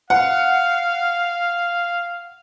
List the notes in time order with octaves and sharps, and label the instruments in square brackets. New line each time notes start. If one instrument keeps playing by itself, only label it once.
[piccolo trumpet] F5 [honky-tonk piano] F#5